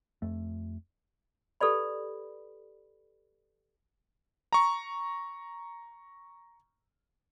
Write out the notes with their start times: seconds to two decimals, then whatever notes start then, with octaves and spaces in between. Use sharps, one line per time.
0.22 F2 A3
1.61 G4 A4 B4 D5 B5
4.53 A#5 C#6